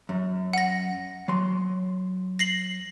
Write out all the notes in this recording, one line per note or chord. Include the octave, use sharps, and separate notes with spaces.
F#2
F#5 A#6
F#3 C6
A#6 C7 F#7